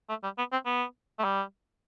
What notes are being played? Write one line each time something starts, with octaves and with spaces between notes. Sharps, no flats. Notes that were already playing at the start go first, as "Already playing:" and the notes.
A3
G3
B3
C4
B3
A3
G3